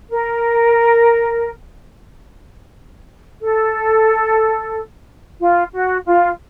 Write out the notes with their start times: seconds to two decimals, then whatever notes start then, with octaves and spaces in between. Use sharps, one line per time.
0.11 A#4
3.42 A4
5.40 F4
5.73 F#4
6.06 F4